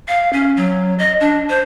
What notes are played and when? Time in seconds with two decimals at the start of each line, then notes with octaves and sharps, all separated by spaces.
0.08 F5
0.33 C#4
0.57 F#3
0.99 D#5
1.20 D4
1.50 C5